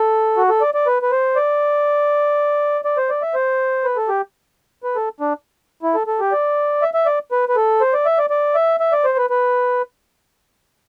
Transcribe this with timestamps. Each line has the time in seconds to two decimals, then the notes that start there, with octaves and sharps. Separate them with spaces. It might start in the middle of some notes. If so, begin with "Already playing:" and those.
Already playing: A4
0.37 F#4
0.49 A4
0.61 D5
0.74 D5
0.87 B4
1.02 B4
1.12 C5
1.36 D5
2.85 D5
2.97 C5
3.10 D5
3.22 E5
3.34 C5
3.84 B4
3.97 A4
4.08 G4
4.84 B4
4.96 A4
5.20 D4
5.83 E4
5.95 A4
6.07 A4
6.20 G4
6.32 D5
6.82 E5
6.94 E5
7.06 D5
7.32 B4
7.49 B4
7.56 A4
7.81 C5
7.94 D5
8.06 E5
8.19 D5
8.30 D5
8.55 E5
8.80 E5
8.93 D5
9.05 C5
9.17 B4
9.30 B4